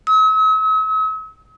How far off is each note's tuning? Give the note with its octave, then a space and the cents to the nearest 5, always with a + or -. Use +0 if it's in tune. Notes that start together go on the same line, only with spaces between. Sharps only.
E6 -45